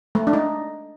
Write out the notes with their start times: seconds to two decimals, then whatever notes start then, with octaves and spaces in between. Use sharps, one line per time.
0.15 A3
0.27 D4
0.33 D#4